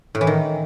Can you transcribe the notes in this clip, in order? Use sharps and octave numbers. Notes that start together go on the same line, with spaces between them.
A2
E3
D#3